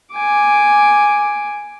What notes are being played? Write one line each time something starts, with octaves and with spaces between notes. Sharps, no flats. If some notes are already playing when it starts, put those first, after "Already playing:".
G#5 D6